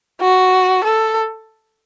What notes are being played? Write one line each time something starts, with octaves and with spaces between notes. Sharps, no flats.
F#4
A4